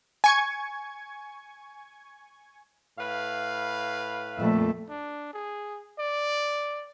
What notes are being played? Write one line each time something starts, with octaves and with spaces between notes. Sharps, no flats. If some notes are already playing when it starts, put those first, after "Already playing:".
G#5 C#6 G#6
A2 B4 F5
F2 A#2 A3 E5
D4
G#4
D5